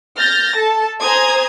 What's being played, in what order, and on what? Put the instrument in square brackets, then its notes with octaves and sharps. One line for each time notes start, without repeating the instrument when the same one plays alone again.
[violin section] F6 G6 A6 A#6
A4 A5
C5 G#5 A#5 D#6 G#6